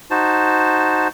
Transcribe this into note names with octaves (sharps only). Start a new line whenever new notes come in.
D#4 F#4 C5 A5